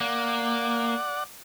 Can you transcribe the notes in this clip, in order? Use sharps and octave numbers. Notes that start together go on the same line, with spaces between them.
A#3 D5 F#5